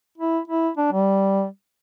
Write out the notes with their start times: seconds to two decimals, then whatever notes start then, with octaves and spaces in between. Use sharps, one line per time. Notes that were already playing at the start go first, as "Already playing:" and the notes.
0.18 E4
0.48 E4
0.78 D4
0.93 G3